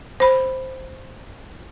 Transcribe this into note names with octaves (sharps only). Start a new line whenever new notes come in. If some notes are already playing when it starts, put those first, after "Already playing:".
C5 B5